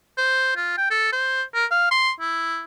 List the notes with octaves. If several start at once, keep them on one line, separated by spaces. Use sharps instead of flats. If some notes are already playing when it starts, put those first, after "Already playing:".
C5
F4
G5
A4
C5
A#4
F5
C6
E4